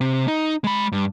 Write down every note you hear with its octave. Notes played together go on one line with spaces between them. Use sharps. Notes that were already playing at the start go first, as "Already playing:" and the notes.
C3
D#4
G#3 B5
G2